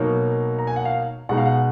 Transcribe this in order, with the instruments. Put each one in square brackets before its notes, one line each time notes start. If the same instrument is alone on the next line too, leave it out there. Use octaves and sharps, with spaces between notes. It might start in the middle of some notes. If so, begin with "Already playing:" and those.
Already playing: [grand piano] B2 F#3 A#3 D#4
A#5
G#5
F#5
F5
B2 G#3 D#4 F#5
F5
F#5